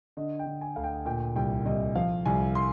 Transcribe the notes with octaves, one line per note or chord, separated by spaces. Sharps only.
D3 D#5
G5
D3
G#5
D2 F5
G5
A#2 G5
C2 G5
C2 D#5
F3 F5
C2 G#5
C6